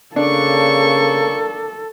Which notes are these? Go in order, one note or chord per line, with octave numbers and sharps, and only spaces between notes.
C#3 A#3 D4 A4 C#6